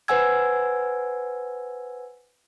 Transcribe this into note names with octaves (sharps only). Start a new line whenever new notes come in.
B4 C5 F#5 G#5 E6 G#6